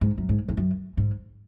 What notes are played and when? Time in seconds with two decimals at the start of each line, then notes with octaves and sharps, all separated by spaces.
0.01 G#2
0.18 F#2
0.29 G#2
0.48 E2
0.57 F#2
0.97 G#2